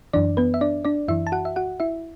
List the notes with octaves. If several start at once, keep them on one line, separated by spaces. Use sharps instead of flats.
F#2 E3 D4 D5
B3 B4
E5
D4 D5
D4 D5
F#2 E3 E4 E5
A5
F#4 F#5
E5
F#4 F#5
E4 E5